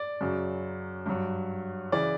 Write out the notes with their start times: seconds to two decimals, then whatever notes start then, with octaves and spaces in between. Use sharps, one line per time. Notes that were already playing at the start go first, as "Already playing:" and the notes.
Already playing: D5
0.21 F#2 C#3 F#3
1.06 G2 F#3
1.92 C#3 E3 D5